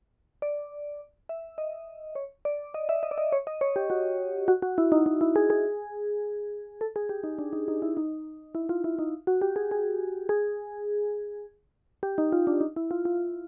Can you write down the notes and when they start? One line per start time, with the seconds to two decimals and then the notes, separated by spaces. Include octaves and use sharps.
0.42 D5
1.29 E5
1.58 D#5
2.15 C#5
2.45 D5
2.74 D#5
2.89 E5
3.03 D#5
3.11 D5
3.18 D#5
3.32 C#5
3.47 D#5
3.61 C#5
3.76 G4
3.90 F#4
4.48 F#4
4.62 F#4
4.78 E4
4.92 D#4
5.06 D#4
5.21 E4
5.36 G#4
5.50 G#4
6.81 A4
6.96 G#4
7.09 G4
7.24 D#4
7.39 D4
7.53 D#4
7.68 D#4
7.82 E4
7.97 D#4
8.55 E4
8.69 F4
8.84 E4
8.99 D#4
9.27 F#4
9.42 G4
9.56 G#4
9.71 G#4
10.29 G#4
12.03 G4
12.18 D#4
12.32 F4
12.47 D4
12.61 D#4
12.76 E4
12.91 F4
13.05 F4